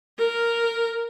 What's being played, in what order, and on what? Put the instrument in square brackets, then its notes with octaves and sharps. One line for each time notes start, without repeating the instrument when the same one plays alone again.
[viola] A#4